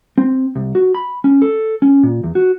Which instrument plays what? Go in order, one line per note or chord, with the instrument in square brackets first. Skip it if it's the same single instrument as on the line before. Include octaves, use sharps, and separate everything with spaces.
[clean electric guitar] C4
C2
F#4
B5
C#4
A4
C#4
A#2
E2
F#4